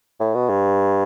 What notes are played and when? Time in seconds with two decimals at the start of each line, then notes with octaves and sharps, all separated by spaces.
0.20 A2
0.34 B2
0.49 G2